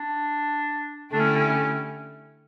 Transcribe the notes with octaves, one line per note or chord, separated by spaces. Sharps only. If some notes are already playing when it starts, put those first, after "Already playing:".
Already playing: D4
D3 A3 D4 E4 G4
C#4
C#4